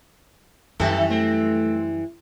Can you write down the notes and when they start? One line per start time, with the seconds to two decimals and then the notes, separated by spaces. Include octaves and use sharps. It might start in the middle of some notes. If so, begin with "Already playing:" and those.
0.80 F#2 D#3 E3 G3 A3 A4
1.10 A3 C4